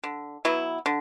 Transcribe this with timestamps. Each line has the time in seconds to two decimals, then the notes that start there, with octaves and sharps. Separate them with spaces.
0.04 D3
0.45 F#3 B3 E4
0.86 D3